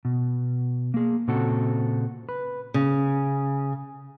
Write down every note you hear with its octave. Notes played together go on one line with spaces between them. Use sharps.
B2
A#3 G#4
A#2 C#3 C4 F#4 A4
B4
C#3